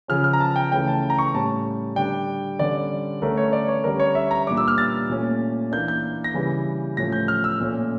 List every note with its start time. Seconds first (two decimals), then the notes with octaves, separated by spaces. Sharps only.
0.08 C#3 F3 C#4 F6
0.24 F6
0.33 A#5
0.40 A5
0.56 G5
0.72 C#3 E3 A3 C#4 G5
0.88 A5
1.10 A#5
1.19 C#6
1.34 A2 G3 C#4 A5
1.96 D3 G3 D4 G5
2.59 D3 G3 C#4 D5
3.22 D3 A3 C#4 A#4
3.37 C#5
3.53 D5
3.68 C#5
3.84 D3 G3 C#4 A#4
4.00 C#5
4.15 E5
4.31 A#5
4.47 A#2 G3 D4 D6
4.57 E6
4.68 F6
4.78 A6
5.10 A#2 A3 C#4
5.72 E3 A#3 D4 G6
5.88 G6
6.24 A#6
6.34 C#3 E3 G3
6.97 A2 F3 A3 C#4 A#6
7.12 G6
7.28 F6
7.44 E6
7.60 A#2 A3 C#4